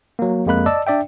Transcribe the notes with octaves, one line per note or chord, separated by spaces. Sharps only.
F#3 A#3
F2 G#3 A#3 B5 F#6
D5 D#5 A5 E6
D4 D5 E5 G5